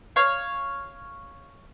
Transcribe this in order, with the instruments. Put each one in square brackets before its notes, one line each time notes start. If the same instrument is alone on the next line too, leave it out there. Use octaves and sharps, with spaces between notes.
[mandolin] C#5 F5